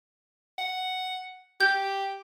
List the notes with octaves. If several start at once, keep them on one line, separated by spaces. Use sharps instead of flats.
F#5
G4 G6